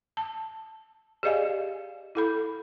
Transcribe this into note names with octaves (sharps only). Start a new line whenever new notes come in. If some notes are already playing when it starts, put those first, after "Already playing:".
A5
G4 G#4 D5 D#5 F5 G#5
E4 A4 B5